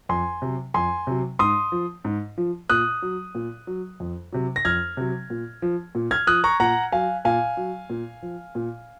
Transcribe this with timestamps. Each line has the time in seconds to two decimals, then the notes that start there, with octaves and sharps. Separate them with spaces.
0.09 F2 G#5 C6
0.42 C3 F#3
0.74 F2 G#5 C6
1.07 C3 F#3
1.39 G#2 C6 D#6
1.72 F3
2.05 G#2
2.38 F3
2.69 A#2 D#6 F#6
3.02 F#3
3.35 A#2
3.67 F#3
4.00 F2
4.32 C3 F#3
4.56 A#6
4.65 F2 F6 G#6
4.97 C3 F#3
5.30 A#2
5.62 F3
5.95 A#2
6.11 F6 G#6
6.27 F3 D#6 F#6
6.44 A#5 C#6
6.60 A#2 F#5 A#5
6.92 F#3 F5 G#5
7.25 A#2 F5 G#5
7.57 F#3
7.90 A#2
8.22 F3
8.55 A#2